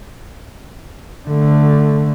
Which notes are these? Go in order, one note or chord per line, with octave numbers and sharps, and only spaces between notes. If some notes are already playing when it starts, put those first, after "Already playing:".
D3 A3